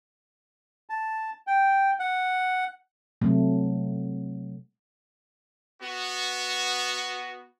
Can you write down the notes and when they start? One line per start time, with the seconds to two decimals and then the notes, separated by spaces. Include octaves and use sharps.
0.90 A5
1.47 G5
1.99 F#5
3.22 C3 F#3 A3
5.81 B3 F#4